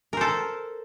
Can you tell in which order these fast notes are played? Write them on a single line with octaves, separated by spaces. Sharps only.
A#4 C5 A4